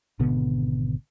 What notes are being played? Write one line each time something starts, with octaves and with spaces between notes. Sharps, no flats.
G#1 B2 D3 B3